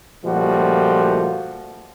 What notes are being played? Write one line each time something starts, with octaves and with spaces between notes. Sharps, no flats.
C#2 A#2 F3 G3 A3 F#4